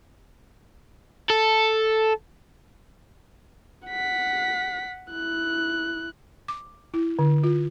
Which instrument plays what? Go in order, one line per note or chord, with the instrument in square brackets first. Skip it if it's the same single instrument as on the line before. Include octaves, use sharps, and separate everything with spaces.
[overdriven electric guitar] A4
[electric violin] F#5 B6
E4 F#6
[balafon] D6
E4
D3
F4